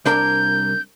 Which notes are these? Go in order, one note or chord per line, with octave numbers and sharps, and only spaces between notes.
C2 D4 A#4 G6